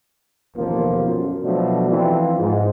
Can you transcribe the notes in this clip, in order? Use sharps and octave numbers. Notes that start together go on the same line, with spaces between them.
A1 D#2 B2 F3 A#3 F4
F#2
B2 F3 F#3 A3 D4
E3 F3 C4 E4 F4
G#2